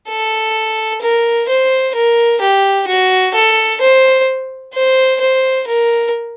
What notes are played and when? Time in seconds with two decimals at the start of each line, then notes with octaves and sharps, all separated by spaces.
0.08 A4
1.02 A#4
1.48 C5
1.95 A#4
2.41 G4
2.87 F#4
3.34 A4
3.81 C5
4.74 C5
5.21 C5
5.67 A#4